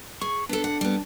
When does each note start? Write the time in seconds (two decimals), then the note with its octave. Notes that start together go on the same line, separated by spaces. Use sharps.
0.21 G#4 C#6
0.49 B3 D4 A4
0.64 F#5
0.81 G3 B3